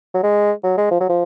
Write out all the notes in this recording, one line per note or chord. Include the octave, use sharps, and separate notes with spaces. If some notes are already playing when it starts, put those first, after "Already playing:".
F#3
G#3
F#3
G#3
F3
F#3
F3